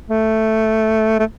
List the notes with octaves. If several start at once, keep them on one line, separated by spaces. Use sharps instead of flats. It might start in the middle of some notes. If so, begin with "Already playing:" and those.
A3
A3